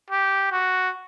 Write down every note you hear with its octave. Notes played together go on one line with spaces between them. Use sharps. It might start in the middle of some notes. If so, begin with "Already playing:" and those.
G4
F#4